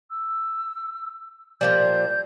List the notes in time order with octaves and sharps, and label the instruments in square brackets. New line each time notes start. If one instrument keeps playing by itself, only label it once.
[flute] E6
[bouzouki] A#2 F3 G3 [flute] G6